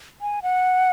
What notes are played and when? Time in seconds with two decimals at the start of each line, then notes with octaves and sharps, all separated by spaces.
0.21 G#5
0.43 F#5